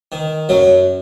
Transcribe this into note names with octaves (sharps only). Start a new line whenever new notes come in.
D#3
F#2 F#3